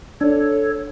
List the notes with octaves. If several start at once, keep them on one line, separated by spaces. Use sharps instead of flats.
D4 A4 C#5